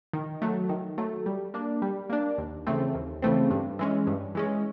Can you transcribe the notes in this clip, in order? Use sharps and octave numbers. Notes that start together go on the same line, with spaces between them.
D#3
F#3 A3
D#3
F#3 A3
G3
A#3 D4
G3
A#3 D4
D#2
C#3 E3 A3 C4
D#2
C#3 E3 A3 C4
G2
E3 G#3 C#4
G2
E3 G#3 C#4